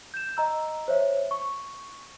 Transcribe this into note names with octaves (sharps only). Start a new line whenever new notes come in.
G6 E7
D#5 A#5 E6
C5 C#5 E5
C#6